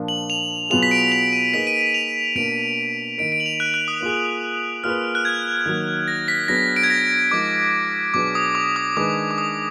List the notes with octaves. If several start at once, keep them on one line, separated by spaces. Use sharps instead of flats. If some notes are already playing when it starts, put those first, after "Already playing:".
Already playing: A#2 F3 A#3 D4
F#7
F7
B2 F#3 B3 F4 G#4 F7
B6
D7
F7
D#7
A#3 D#4 G#4 B4 B6
D#7
D#7
F7
B2 A#3 D4 D7
D#3 A#3 D#4 A#4 D7
D7
F#7
F7
F#6
F#6
D#6
A#3 F4 G#4
A#3 F4 G#4 B4 F6
F#6
G#6
D#3 F#3 A#3
A#6
B6
F#3 B3 D4 G#4 B4 A#6
D7
G#6
A#6
F3 G#3 D#4 A#4 D6
B2 F#3 D4 G#4 B4 D6
D#6
D6
D#6
D#3 G#3 D4 G#4 B4 D6
D6
D#6